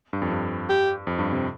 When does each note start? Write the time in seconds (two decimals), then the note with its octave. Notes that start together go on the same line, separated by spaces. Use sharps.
0.13 G2
0.22 F2
0.32 G2
0.69 G4
1.07 F2
1.19 G2
1.32 C3